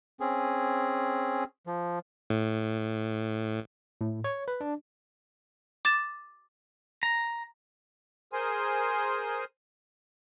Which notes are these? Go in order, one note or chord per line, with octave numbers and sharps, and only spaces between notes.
C4 C#4 G#4
F3
A2
A2
C#5
B4
D4
D6 A6 E7
A#5
G#4 A#4 C5 G#5 C6